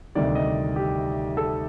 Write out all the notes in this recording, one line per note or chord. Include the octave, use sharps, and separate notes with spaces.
D2 C3 D#3 G3 D5
D#5
G4
A4